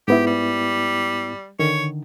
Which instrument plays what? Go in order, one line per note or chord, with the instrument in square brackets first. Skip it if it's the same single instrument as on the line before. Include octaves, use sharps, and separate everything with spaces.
[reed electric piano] G#2 B3 E4 [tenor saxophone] G4
[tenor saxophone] G3
[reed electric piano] D3 D#3 [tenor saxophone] C#5